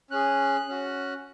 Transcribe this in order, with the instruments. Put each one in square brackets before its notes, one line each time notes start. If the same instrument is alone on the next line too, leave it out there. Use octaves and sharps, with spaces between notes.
[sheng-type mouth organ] C#4 G#4 F#6
C#4 F#4